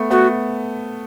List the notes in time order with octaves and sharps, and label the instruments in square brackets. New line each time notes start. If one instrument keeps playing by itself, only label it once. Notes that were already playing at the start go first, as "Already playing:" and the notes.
Already playing: [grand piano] A3 B3
[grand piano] A3 B3 [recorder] F#4